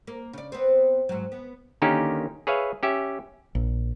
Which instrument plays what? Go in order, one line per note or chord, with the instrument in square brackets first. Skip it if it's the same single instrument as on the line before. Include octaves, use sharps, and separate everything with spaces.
[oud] A#3
C#3 D5
B3 C4
G#2 F#3
B3
[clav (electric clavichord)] D3 D#3 A#3 C#4 D#4 G4
G#4 B4 C#5 E5 F5
C#4 G4 E5
[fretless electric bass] A#1